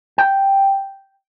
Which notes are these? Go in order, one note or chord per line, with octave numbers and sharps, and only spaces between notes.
G5